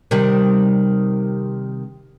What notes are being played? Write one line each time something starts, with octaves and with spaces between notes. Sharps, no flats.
C3 D#3 G3